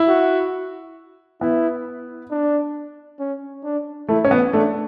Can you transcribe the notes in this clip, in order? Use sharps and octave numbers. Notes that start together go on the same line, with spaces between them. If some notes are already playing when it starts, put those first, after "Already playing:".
Already playing: E4
F#4
B3 E4
D4
C#4
D4
A3 E4
C#4
B3
A3 D4